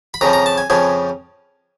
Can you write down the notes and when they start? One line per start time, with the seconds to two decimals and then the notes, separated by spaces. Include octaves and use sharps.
0.14 B5
0.21 F2 C#3 F3 A#5
0.33 A#5
0.46 A5
0.58 G#5
0.70 F2 C#3 F3 G#5